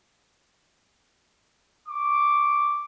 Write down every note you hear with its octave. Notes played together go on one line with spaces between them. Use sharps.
C#6 D6